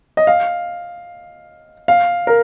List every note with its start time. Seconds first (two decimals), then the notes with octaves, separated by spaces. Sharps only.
0.17 D#5
0.27 F5
1.88 F5
2.27 A#4